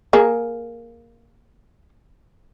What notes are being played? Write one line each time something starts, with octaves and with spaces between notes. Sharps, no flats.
A#3 G#4